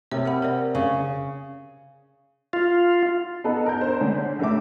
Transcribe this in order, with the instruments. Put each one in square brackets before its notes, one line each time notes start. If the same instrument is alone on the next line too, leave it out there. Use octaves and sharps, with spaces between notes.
[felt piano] C3 [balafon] A#4 C#5 E5
[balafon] A#4 F#5 B5
A#4 C5 D5
[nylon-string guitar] C#3
[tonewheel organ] F4
[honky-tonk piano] B3 D#4 A4 B4
A#4 G6
D4 C5
D3 G#3 C#4 D4
A#1 C#3 A3 E5 D6